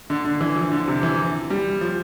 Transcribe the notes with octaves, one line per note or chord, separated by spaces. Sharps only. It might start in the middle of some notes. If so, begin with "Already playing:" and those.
D3
D3
E3
F3
D3
C3
E3
G3
F3